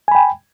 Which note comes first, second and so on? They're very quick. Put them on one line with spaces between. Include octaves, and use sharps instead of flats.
G#5 B5 G5